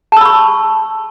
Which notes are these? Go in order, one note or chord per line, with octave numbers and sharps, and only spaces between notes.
A5 B5 C#6 E6